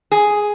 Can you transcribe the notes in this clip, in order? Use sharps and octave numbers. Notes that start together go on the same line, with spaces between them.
G#4